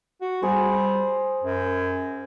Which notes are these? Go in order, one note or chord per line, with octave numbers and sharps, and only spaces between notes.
F#4
G3 G#4 C5
F#2